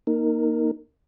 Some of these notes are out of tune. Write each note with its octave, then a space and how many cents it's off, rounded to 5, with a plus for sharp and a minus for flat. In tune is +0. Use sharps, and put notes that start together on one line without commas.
A#3 +15 D#4 +0 A#4 -10